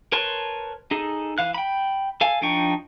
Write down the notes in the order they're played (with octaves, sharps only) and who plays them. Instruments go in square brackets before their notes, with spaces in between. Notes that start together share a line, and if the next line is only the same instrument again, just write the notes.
[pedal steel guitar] A#4 B4 C#5 A5 C6
D#4 G#4 A4
E3 F5 F#6
G5 B5
A4 F5 G#5
F3 D4 D#4 G5 C#6